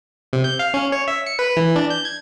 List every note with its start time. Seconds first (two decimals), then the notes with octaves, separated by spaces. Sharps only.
0.33 C3
0.44 G6
0.59 F5
0.74 C#4
0.92 C#5
1.08 E5
1.27 C#7
1.39 B4
1.57 E3
1.76 D4
1.90 G6
2.05 G#6